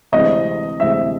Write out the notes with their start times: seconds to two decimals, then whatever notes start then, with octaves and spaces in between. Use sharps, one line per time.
0.12 D2 C3 E3 G#3 C4 D#5
0.80 D2 C3 E3 G#3 C4 E5